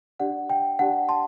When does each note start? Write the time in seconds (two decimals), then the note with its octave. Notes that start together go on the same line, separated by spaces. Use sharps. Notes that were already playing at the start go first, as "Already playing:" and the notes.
0.19 D4 G4 D5 F#5
0.50 G5
0.79 D4 G4 D5 F#5 A5
1.09 A5 C6